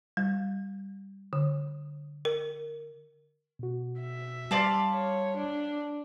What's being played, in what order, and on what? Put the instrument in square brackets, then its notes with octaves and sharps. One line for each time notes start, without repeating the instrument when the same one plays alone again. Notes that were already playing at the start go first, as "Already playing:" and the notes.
[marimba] G3
D3
A#4
[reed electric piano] B2 F#4
[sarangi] E5
[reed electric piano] G3 C6 [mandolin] D5 F5 A5
[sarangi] C#5
D4